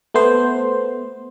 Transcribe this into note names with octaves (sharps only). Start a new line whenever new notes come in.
A3 B3 C5